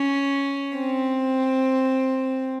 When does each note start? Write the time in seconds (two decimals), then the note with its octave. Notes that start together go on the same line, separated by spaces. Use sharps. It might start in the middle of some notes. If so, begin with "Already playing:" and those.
Already playing: C#4
0.76 C4